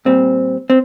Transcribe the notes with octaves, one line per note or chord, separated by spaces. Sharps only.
A#2 G3 C4
C4